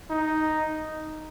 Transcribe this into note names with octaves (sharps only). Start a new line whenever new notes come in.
D#4